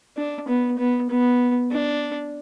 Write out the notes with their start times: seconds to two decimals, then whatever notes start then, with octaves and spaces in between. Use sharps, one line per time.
0.17 D4
0.48 B3
0.78 B3
1.10 B3
1.71 D4